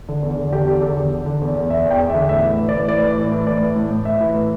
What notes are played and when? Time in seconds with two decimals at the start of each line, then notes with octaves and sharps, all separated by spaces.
0.09 D3
0.22 E2
0.37 D3
0.52 D3 G4
0.67 E2 G4
0.82 D3 A4
0.97 D3
1.12 D3
1.26 D3
1.41 E2
1.55 E2
1.70 E2 E5
1.85 E2
1.91 G5
2.00 E2
2.10 E5
2.15 D3
2.29 A2 E5
2.44 E3
2.58 E3
2.69 D5
2.74 A2
2.88 E3 D5
3.03 A2
3.18 E3
3.32 A2
3.47 E3 D5
3.62 A2
3.76 A2
3.91 A2
4.05 A2 E5
4.20 E3
4.35 A2